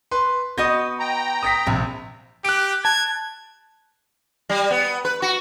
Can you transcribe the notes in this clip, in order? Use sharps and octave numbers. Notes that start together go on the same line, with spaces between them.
B4 C6
B3 F#4 D#5 G6 A#6
G5 A#5
D#6 A#6 B6
A#1 C3
G4 F#6 D7
A5 G#6
G3
B3
B4
F#4